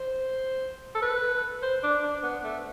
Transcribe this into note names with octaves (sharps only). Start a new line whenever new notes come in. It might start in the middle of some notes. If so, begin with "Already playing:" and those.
Already playing: C5
A4
B4
C5
D4
D4
B3
A3